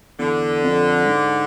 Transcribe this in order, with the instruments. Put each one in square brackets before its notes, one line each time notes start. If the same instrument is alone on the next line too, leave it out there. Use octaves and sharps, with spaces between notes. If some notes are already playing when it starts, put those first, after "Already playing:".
[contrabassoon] E2 [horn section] D3
[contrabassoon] F2
G#2